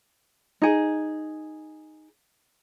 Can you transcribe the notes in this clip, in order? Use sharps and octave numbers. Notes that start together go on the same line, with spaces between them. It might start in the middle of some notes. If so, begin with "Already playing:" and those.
D#4 G#4